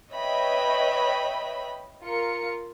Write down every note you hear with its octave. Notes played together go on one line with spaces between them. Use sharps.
B4 C#5 D#5 E5 G5 B5
F4 A#4 C#7